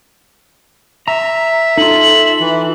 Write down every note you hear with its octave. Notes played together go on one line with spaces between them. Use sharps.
E5 A#5
D#4 F4 A4 F#7
E3